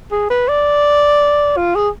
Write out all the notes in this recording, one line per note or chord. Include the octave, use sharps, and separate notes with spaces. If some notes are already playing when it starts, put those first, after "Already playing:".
G#4
B4
D5
F4
G#4